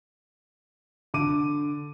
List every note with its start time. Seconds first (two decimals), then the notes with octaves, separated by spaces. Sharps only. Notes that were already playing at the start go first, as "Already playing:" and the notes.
1.14 D3 D6 D#7